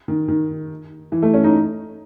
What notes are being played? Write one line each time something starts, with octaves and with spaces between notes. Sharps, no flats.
D#3
D#3
E3
A3
C#4
D#4